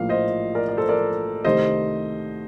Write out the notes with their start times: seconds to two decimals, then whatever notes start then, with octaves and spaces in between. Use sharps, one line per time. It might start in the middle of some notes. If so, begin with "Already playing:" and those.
Already playing: A#1 A2 F3 A#3 F5
0.09 C5 D#5
0.55 A#4 D5
0.69 D5
0.77 A4 C5
0.89 A#4 D5
1.45 C2 C3 D#3 A3 C5 D#5